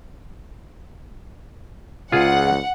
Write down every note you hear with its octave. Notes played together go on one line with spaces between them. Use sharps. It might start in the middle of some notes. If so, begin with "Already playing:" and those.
C#2 F4 G#4 F#5